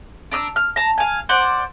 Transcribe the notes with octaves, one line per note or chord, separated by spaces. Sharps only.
D4 A#5 D#6 E6
F6
A5 A#5
F5 G#5
C5 D5 F#5